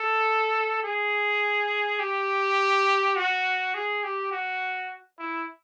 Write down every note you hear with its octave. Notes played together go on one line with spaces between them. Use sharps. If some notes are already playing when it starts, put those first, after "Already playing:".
Already playing: A4
G#4
G4
F#4
G#4
G4
F#4
E4